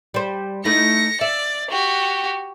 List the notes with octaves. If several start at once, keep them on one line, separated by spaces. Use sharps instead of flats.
G3 C5
A3 D#4 E4 A#6 C#7
D5 E5
F#4 G4